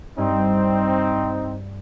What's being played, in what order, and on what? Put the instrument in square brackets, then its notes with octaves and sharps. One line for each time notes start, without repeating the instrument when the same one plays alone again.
[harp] G2 [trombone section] C4 D#4